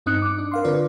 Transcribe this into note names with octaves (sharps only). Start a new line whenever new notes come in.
G2 C4 D#4 D#6 F#6 C#7
D6
D4
A#4 F5 C6
D3 C4 F4 B4 D5